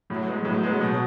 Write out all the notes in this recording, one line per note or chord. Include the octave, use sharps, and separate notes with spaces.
A2 F#3
G#3 B3
A2 F#3
G#3 B3
B2